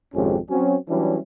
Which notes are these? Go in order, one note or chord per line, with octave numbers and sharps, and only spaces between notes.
G#1 F2 C3 G#3 C#4 G4
F#3 C4 C#4
E3 F#3 G3 C#4 D4 E4